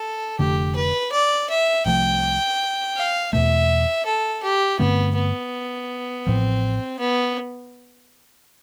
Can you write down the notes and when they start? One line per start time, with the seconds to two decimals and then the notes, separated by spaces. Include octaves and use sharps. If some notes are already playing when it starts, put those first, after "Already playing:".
Already playing: A4
0.39 F1 F2 D3 A3 G4
0.76 B4
1.12 D5
1.50 E5
1.86 C2 C3 F3 A3 G5
2.97 F5
3.33 E2 B2 A3 E5
4.06 A4
4.43 G4
4.79 G2 D3 A3 B3 C4
5.16 B3
6.26 A1 A2 F3 C4
6.99 B3